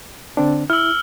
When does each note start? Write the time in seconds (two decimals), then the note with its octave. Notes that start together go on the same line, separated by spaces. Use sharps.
0.37 D3 C4 D4
0.70 E4 E6 F6